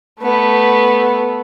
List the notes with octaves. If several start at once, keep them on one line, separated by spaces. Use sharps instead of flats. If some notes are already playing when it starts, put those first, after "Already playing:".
A3 B3